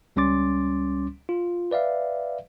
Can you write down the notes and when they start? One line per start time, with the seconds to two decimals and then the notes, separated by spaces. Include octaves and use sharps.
0.16 C#2 G3 C#4 C6 D6 A6
1.29 F4
1.71 B4 D5 E5 F5